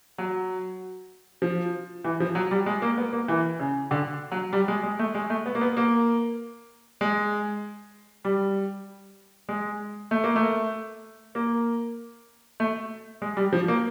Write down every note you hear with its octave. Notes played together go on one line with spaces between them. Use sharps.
F#3
F3
E3
F3
F#3
G3
G#3
A#3
B3
A#3
E3
C#3
D3
F#3
G3
G#3
G#3
A3
G#3
A3
B3
A#3
B3
A#3
G#3
G3
G#3
A3
A#3
A3
A#3
A3
G#3
G3
F3
A#3